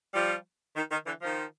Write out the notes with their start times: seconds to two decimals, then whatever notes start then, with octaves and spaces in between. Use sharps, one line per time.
0.14 F3 G3
0.75 D#3
0.90 D#3
1.06 D3 E3
1.21 D#3 F3